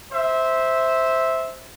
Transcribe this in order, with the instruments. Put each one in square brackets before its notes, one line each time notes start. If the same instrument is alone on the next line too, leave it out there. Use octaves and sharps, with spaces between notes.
[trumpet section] C5 E5